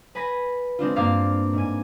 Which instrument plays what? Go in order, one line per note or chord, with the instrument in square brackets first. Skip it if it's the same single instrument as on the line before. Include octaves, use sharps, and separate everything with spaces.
[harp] B4 G#5 B5 A#6 B6
G#3 C4 D4 F4
G2 A#3 C4 F5 D6 A6
G#2 G#5